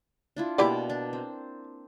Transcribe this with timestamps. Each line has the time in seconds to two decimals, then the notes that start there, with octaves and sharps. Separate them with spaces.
0.36 D4 E4 F4
0.58 B2 A#3 E4 G4 D5 D6
0.90 D4
1.13 C4